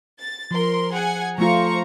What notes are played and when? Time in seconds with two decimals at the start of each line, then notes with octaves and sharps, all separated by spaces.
0.19 A6
0.51 F3 A#4 C6
0.93 G#4 F#5 G#5
1.38 F3 A3 F4 C5 A#5 C#6